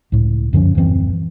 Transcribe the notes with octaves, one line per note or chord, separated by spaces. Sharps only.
C#2 A2
F#2 D3 F3 C#4
D#1 F#2 E3 C4